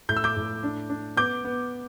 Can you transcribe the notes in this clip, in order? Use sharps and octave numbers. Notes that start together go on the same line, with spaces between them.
A2 G6
E6
D6 G6
A2
D4
D4
B3 D6 G6
B3